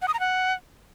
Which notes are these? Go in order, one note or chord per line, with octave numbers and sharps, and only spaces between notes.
F#5
D#6
A#5
F#5